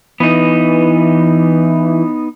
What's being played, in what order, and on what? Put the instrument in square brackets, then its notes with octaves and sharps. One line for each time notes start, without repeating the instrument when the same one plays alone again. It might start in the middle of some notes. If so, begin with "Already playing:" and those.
[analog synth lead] E3 [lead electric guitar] B3 D#4